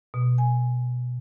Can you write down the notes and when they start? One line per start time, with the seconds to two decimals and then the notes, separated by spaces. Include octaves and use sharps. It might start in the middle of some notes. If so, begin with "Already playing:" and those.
0.14 B2
0.38 G#5